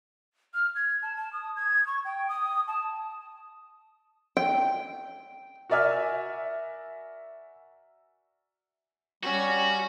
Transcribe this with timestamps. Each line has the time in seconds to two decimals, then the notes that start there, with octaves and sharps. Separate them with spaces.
0.54 F6
0.75 G#6
1.03 A5
1.17 A5
1.33 D#6
1.56 G#6
1.87 C#6
2.05 G5
2.29 D#6
2.68 A5
4.37 G5
5.70 F#4 A#4 D5 E5 G#5 F6
9.23 G3 C#4 F#4